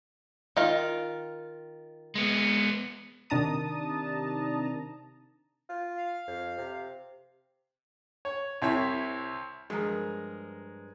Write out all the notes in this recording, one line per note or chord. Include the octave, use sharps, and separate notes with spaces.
D#3 F4
G#3 B3
C3 D#3 D4 A5 A#5 D#6
F4
F5
F2
C3
C#5
C2 C3 C4 E4 C#5 E5
G2 F3 G#3 A#4